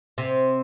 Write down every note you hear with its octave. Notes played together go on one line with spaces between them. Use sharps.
C3